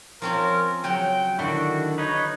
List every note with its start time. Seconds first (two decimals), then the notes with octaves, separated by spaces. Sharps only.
0.22 F3 C4 C#4 A#4
0.84 C#3 F#3 F#4 G5
1.39 D3 D#3 D4 E4 F#4
1.98 D#4 B4 C#5